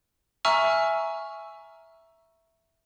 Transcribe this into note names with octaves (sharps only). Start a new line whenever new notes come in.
E5 G#5 A#5 C#6 E6 F6